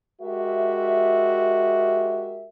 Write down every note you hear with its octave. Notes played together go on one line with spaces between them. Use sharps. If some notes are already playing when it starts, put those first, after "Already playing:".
G#3 F#4 G4 A#4 E5